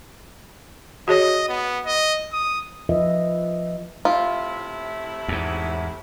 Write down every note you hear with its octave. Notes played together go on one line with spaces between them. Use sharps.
F#4 G#4 C#5 D#5
B3
D#5
D#6
F3 F4 B4 D#5 E5
A2 C3 E4 F4
E2 G#2